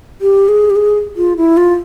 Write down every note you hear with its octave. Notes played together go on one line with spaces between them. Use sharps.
G4
G#4
G4
G#4
F4
E4
F4